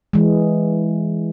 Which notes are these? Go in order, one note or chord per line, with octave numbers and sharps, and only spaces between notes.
E3 G#3